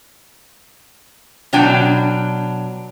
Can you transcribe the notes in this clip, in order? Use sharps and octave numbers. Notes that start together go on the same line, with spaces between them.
B2 F#3 D4 G5 G#5